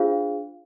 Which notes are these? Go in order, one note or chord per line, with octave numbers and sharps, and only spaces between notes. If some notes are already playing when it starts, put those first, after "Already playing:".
Already playing: D4 F4 G#4 C5 F5